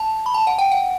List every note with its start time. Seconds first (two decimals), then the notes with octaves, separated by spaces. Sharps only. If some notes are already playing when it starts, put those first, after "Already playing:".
Already playing: A5
0.26 B5
0.34 A5
0.47 F#5
0.59 G5
0.72 F#5